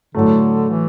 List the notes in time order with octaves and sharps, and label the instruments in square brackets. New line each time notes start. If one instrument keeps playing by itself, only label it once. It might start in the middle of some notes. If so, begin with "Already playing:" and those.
[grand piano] A2 F#3 A3 [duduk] D3
[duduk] E3